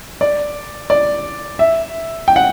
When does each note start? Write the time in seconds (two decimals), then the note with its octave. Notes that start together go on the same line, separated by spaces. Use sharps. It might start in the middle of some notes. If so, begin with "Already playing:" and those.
0.21 D5
0.90 D5
1.59 E5
2.28 G5
2.36 F#5